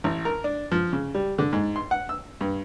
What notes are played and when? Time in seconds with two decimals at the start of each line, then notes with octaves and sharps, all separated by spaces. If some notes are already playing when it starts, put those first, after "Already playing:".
0.04 A1
0.25 A#4
0.44 D4
0.71 F3
0.93 C#3
1.14 G3
1.38 D3
1.53 G#2
1.76 C6
1.91 F#5
2.09 E6
2.41 G2